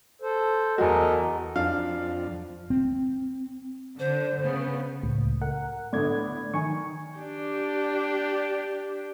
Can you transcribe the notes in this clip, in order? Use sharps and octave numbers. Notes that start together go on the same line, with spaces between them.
A4 C5
E2 F#4 A4 A#4 D#5
F2 D4 F5
C4
D3 C5
C#3 B3
C#2 A2
A#4 F#5
A2 D3 B3 D5 G#6
D#3 G#5 C#6
D4 G4